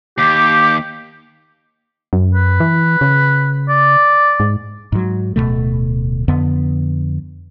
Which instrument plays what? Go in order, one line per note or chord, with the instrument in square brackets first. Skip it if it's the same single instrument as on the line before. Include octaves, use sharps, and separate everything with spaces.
[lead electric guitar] D#2 [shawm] G4 [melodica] D6
[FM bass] F#2
[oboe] B4
[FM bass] E3
C#3
[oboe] D5
[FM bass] G#2
[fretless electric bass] G#2 F#3
D1 D#2 B2 A3
F2 D3 B3